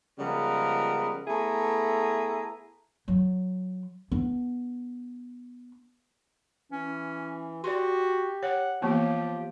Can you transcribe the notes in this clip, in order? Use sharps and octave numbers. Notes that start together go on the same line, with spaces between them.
C#3 F3 G3 G#3 B3 A#4
A3 B3 E4 G#4 A4 A#5
F#3
B3 D4
E3 C#4
F#4 G4 D5 C6
C#5 F#5
E3 F3 A#3 B3 G4